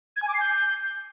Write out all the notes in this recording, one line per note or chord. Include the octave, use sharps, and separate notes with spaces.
G#6
G#5
D6
C7
G6